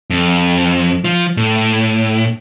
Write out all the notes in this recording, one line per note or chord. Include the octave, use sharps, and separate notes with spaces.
F2
F3
A2